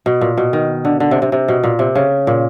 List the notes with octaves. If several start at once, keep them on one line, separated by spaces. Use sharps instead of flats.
B2
A#2
B2
D#3
D3
D3
C3
C3
C3
B2
A#2
C3
C#3
A#2